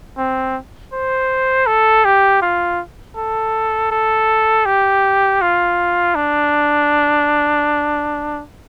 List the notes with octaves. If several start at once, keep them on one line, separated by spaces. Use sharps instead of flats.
C4
C5
A4
G4
F4
A4
A4
G4
F4
D4